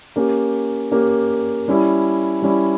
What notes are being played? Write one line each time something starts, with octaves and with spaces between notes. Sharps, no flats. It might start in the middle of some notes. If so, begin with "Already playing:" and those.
A#3 C#4 G4
A#3 C#4 G4
G3 C#4 E4
G3 C#4 E4